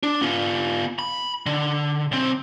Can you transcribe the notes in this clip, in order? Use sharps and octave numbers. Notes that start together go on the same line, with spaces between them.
D4
B3 F4
B5
D3
B1 C4